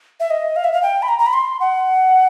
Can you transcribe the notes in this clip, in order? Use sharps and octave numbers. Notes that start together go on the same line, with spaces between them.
E5
D#5
F5
E5
F5
G5
B5
A#5
A#5
B5
C6
F#5